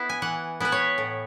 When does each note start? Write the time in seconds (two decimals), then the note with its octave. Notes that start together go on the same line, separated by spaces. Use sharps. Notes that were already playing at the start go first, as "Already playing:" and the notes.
Already playing: B3 E4
0.09 G#5
0.22 E3 F#5
0.60 B3 E4 B4
0.72 C#5
0.98 A2